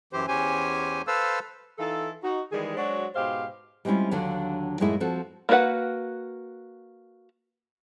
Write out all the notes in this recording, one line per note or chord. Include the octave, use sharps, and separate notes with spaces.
F#2 E3 G4 C5
E2 C#4 G4 C5 G#5
A4 B4 C5 F5 E6
E3 D#4 F4 A4
D#4 F#4
D#3 E3 G3 G#3 G#4
F#3 G#3 D4 F#4 C5 C#5
G#2 B2 G#3 G4 C5 F5
G3 G#3 C4 C#4 E4 F4
D#2 D3 F#3 A#3 D4 F5
F#2 A2 G#3 A#3 E4
F3 C4 F#4 A4
A#3 D4 F#4 B4 F#5